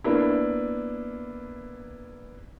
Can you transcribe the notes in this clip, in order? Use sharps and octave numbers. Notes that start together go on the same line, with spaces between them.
A#3 B3 D4 E4